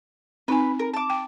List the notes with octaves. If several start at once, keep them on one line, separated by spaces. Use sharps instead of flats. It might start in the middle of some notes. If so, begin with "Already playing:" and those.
C4 D#4 B4 G#5
A#4
A5 D6
G5